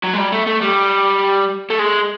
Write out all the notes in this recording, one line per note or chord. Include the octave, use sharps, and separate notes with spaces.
F#3
G#3
G3
A3
A3
G3
A3
G#3